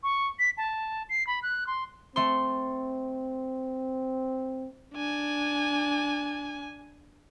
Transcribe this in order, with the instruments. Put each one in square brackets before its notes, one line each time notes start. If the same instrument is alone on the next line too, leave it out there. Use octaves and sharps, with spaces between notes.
[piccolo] C#6
B6
A5
C7
B5
F#6
C6
[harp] A3 C6 [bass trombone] C4
[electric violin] D4 G#5